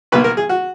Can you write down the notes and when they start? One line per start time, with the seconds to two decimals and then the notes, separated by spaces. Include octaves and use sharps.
0.12 B1 B2 A#3 B4
0.24 A#4
0.37 G#4
0.49 F#4